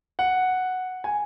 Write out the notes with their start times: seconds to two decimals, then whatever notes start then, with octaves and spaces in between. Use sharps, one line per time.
0.19 F#5
1.04 G#5